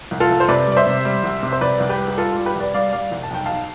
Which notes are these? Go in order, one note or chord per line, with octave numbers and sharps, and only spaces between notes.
C2
F4 A4
C2
C5
C3 B4 D5
G3 D5
C5 E5
C3
G3
C2
C3
C5
C2 B4 D5
C2
G4 B4
G3
G4
G3 F4 A4
G3 F4
G4 B4
C2
B4 D5
G3 D5 F5
G3 D5 F5
C2
A5
B1 G5
B1 F5 A5